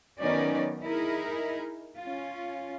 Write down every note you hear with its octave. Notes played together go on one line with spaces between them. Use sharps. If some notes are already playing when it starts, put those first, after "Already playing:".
D#3 F#3 B3 C#4 D#4 D5
D#4 E4 G#4 A#4
C#4 F4